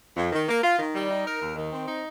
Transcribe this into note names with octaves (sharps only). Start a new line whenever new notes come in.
F2
D#3
A#3
F4
D#3
G3
D#4
A#4
D#2
D#3
C4
D#4